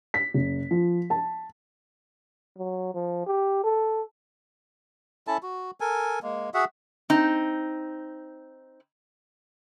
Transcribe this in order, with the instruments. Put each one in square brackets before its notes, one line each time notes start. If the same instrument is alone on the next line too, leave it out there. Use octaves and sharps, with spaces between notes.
[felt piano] B6
F#1
F3
A5
[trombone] F#3
F3
G4
A4
[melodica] C#4 E4 A4 A5
F#4
A4 A#4 G#5
G#3 A#3
F#4 G#4 E5 F#5
[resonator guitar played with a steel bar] C4 D#4